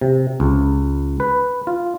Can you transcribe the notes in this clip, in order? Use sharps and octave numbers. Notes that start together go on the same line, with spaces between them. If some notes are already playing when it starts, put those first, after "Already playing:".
C3
C#2
B4
F4